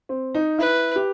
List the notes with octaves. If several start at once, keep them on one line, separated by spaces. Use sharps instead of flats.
C4
D#4
E4 B4
G4